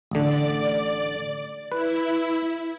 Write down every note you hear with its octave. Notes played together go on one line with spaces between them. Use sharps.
A1 D3 D5
E4 B4